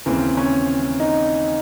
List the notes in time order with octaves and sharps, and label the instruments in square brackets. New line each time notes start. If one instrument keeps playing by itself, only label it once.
[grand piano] D#2 C#3 E3 C4
C#4
D#4